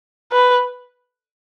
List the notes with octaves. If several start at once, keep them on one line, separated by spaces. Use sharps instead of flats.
B4